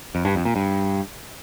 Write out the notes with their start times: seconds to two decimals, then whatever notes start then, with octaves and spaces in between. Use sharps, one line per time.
0.15 F2
0.25 G2
0.35 F2
0.45 A#2
0.56 G2